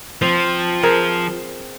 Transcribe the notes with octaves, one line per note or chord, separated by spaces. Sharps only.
F3 C4
C4 G#4 A#4